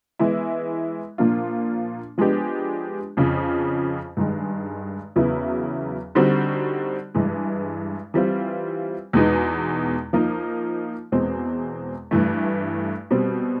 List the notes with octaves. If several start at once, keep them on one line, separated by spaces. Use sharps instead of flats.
E3 G#3 B3 E4
A#2 F3 A#3 D4 F4
F3 G#3 B3 D4 G4
F2 C#3 F3
G2 D#3 G#3
E2 C#3 F#3 B3 E4
D3 G3 C4 D#4 F#4
G2 E3 G#3
E3 G3 C4 F4
E2 B2 G#3 B3 D#4
F3 A#3 D#4
E2 B2 G#3 C4
G2 E3 A3
B2 G3 C4